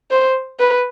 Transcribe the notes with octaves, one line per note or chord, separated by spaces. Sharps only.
C5
B4